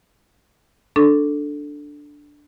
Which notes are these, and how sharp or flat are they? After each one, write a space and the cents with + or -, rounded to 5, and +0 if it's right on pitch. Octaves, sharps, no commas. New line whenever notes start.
D4 +0 A4 +0 C#6 +0